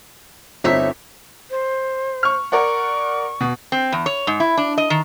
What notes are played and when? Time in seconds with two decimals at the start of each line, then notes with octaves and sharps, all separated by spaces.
0.64 G1 C4 D#4 C#5 E5 B6
1.50 C5
2.23 C#6 F6
2.52 A#4 D5 F#5 C#6
3.41 B2
3.72 C4
3.92 E2
4.06 C#5
4.27 G#2
4.40 E4
4.57 D4
4.78 D#5
4.90 D#3